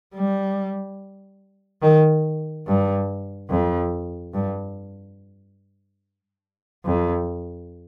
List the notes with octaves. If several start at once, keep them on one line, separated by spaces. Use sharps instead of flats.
G3
D#3
G2
F2
G2
F2